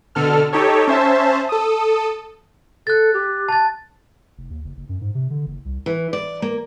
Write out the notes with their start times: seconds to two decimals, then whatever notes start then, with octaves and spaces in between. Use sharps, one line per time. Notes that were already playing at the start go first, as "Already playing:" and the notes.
0.15 B2 D3 A4 F6
0.53 D#4 G4 A4 C#5
0.88 C#4 C5 E5 A5
1.49 A4 D#6
2.87 A4 F#6 A6
3.14 G4
3.49 A5 A6
4.38 F1
4.50 D#2
4.64 F#1
4.77 F#1
4.89 F#2
5.01 G#2
5.15 C3
5.30 D3
5.46 F#1
5.65 C2
5.86 E3
6.13 D5
6.42 A#3